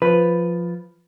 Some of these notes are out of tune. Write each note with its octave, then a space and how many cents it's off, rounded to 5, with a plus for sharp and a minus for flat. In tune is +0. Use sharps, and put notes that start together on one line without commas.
F3 +0 B4 +0